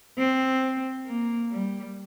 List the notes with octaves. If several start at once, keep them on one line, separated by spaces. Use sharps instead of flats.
C4
A#3
G3